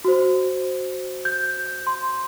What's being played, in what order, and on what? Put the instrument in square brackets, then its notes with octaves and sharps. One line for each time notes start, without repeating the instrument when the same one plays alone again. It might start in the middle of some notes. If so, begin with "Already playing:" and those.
[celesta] F#4 C5
G6
C6